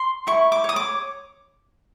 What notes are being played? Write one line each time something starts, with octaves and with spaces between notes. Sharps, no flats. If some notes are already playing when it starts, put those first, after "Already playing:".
Already playing: C6
E4 C#6
D6
C#5 D#6
D6